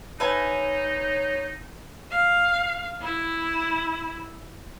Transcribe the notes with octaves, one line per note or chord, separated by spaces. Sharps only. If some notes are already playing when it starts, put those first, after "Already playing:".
D#4 B4 C#5 E5 G#5
F5
E4